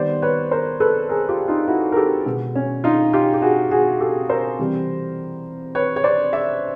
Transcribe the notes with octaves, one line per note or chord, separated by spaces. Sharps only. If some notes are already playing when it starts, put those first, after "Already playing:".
Already playing: D#3 G3 B3 C5 D5
B4 C#5
A#4 C5
A4 B4
G#4 A#4
F4 G4
D#4 F4
E4 F#4
A#4
G4 A4
B2 G#3 B3
C#4
D#4 F4
F4 G4
G4
F#4 G#4
F#4 G#4
G4 A4
A#4 C5
C3 E3 G3 C4
B4 C#5
C#5
C5 D5
D5 E5